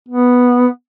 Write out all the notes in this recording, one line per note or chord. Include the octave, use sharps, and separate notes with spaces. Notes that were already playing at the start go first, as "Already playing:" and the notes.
B3